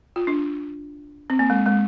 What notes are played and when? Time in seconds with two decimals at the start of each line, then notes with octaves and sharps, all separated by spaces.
0.16 F4
0.27 D4
1.30 C4
1.39 A#3
1.50 G#3
1.66 G#3